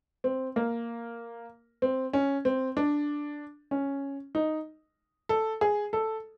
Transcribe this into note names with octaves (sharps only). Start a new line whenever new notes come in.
C4
A#3
C4
C#4
C4
D4
C#4
D#4
A4
G#4
A4